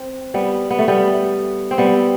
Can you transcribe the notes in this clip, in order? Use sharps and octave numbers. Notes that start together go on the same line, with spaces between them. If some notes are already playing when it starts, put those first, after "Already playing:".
Already playing: C4
G3 B3
B3
A3
G3 B3
C4
G3 B3